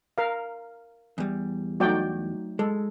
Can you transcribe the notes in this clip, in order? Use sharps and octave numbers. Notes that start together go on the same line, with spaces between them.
A#4 F5
E2 G3
F#3 A3 D#4 F#4 D5 G5
G#3 A4